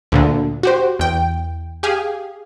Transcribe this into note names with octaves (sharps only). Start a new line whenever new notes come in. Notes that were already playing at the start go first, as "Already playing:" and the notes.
D2 A#2 D3
F#4 G4 C5
E2 G5
G4 G#4 F5